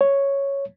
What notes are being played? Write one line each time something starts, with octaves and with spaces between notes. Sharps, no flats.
C#5